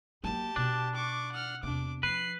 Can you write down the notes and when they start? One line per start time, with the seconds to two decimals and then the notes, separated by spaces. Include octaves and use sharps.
0.24 F#3 A#3 G4 A5
0.56 B2 D4
0.95 C#6 D6
1.32 F#5 F6
1.63 E2 C3 D4 D6
2.03 F3 B4 C7